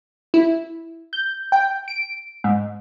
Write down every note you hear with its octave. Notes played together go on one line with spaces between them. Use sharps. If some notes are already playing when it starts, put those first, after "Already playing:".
E4
G6
G5
D7
G#2